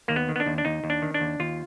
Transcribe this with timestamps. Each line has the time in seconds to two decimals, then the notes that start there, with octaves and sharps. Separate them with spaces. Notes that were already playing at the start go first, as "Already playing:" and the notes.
0.08 D#2 A#3
0.16 B3
0.29 D#3
0.36 B3
0.40 D4
0.46 D#2
0.58 D4
0.65 D#2 D#4
0.84 D#2
0.90 D4
1.02 D#3
1.14 D4
1.21 D#2
1.40 D#2 F4